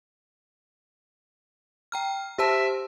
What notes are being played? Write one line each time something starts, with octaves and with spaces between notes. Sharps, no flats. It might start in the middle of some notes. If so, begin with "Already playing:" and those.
G5 A#5 F6
G4 C5 E5 A5